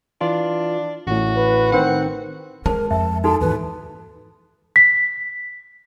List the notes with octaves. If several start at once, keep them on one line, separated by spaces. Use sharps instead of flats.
E3 D4 F4
A1 A2 F#4
B4
D#3 C4 C5 F#5
G#3 A#4 C5 A5
F2 E5 A5
D#4 F#4 A4 A5
D#2 G#2 E3 B4
B6